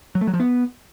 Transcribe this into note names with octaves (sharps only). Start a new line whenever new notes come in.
F#3
A3
F#3
F3
B3